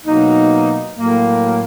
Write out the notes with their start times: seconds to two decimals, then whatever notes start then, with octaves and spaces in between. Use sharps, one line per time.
0.06 B2 F#3 A#3 D#4
0.95 A2 F#3 A#3